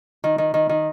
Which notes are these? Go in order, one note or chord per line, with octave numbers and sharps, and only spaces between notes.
D#3
D#3
D#3
D#3